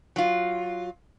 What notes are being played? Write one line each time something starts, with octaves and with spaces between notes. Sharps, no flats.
F#3 F4